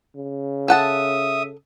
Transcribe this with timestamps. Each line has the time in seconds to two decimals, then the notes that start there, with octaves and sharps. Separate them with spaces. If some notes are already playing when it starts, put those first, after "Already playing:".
0.16 C#3
0.68 A4 E5 F#5 A5 D#6